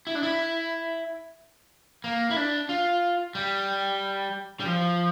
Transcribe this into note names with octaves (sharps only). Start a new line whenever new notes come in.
E4
D4
E4
A#3
E4
D4
F4
G3
G3
F3